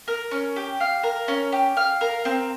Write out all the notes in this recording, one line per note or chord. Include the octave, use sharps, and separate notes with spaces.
A#4
C#4
G4
F5
A#4
C#4
G4
F5
A#4
C4